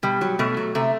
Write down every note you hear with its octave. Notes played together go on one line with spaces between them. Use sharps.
B2 G3
F#3
B2 A3
F#3
C3 A3